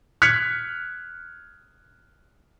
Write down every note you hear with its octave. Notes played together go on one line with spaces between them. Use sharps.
F6 F#6 G#6 B6 C#7